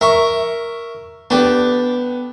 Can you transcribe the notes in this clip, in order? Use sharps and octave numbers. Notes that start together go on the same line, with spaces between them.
A#4 E5 C#6
B3 D4 G4 A4